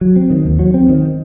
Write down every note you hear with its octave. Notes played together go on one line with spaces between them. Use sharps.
F#3
C4
D#3
D#2
F#3
C4
D#3